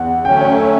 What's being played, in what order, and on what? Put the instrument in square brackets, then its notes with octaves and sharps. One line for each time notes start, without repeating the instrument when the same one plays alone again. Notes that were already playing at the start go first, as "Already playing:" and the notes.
Already playing: [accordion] E2 [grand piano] F#5
[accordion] D3 F#3 A3 C#4 [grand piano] G5
[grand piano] C#5
E5